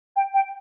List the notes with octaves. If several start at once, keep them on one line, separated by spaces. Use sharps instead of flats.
G5
G5